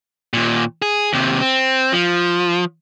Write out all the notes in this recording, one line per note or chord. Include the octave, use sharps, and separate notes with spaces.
D#2 A#2
G#4
D#2 C3
C4
F3